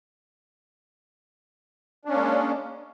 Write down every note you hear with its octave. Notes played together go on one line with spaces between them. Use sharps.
G#3 A#3 C#4 D4